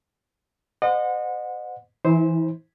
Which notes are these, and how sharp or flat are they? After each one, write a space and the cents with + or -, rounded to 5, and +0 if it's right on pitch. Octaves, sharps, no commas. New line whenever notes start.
C5 -35 D#5 -35 F#5 -30
E3 +0 E4 -35 C5 +0